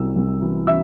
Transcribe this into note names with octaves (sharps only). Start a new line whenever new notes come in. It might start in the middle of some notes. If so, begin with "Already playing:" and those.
Already playing: C2 C3 E6
C2
E3
E3 E5 E6